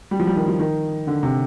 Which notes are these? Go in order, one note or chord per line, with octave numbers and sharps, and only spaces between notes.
G3
F3
G3
D#3
F3
D#3
D3
C3